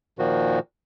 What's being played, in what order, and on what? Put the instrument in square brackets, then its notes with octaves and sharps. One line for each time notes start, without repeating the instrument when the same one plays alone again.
[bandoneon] A#2 D#3 F3 F#4